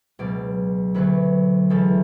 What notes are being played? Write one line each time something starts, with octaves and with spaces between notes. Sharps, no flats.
C#2 B2 F#3 D5
D2 D3 F#3 B4
C#2 C#3 E3 A4